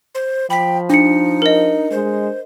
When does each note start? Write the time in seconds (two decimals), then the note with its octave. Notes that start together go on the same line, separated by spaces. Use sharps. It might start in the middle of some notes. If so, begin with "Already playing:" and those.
0.15 C5
0.50 F3 G5 B5 B6
0.90 D4 D#4 C#7
1.42 A#4 D#5
1.91 G#3 C5